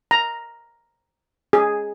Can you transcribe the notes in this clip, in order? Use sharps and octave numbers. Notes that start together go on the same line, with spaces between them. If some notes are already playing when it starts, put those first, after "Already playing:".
A#5
G#4